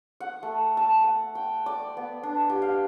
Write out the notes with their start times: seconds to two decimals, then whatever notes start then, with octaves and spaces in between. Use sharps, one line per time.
0.20 F#5
0.43 A3
0.77 A5
1.01 F#5
1.35 G5
1.66 D5
1.97 B3
2.23 D4
2.50 G4
2.62 F5